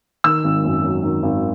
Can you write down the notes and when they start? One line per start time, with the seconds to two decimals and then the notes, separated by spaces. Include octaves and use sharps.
0.24 D#3 E6
0.44 G#1
0.64 F#2
0.84 F#3
1.03 D#3
1.23 G#1